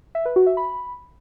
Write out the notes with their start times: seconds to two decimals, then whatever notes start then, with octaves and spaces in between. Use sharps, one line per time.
0.15 E5
0.25 B4
0.36 F#4
0.47 E5
0.57 B5